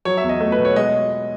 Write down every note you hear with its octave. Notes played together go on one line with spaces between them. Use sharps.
F#3 C#5
E5
E2
D#5
A3
B4
B2
C#5
G#3 D#5